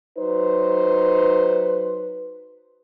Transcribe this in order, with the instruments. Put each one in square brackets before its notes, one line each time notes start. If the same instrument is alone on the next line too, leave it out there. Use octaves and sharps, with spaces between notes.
[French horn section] F#3 D#4 C5 [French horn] B4